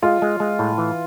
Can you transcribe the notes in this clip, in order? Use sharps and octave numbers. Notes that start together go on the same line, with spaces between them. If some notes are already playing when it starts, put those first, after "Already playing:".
G#3 F4
G#3
G#3
A2
E3